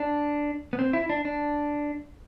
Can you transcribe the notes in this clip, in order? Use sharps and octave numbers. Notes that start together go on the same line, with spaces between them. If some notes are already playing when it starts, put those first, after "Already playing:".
Already playing: D4
B3
C4
E4
D4
D4